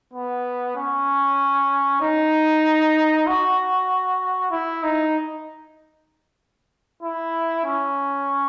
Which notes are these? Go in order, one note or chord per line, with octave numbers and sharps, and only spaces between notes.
B3
C#4
D#4
F#4
E4
D#4
E4
C#4